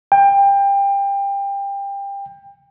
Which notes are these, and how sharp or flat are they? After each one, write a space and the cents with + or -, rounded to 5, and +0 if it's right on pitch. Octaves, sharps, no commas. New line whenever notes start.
G5 +25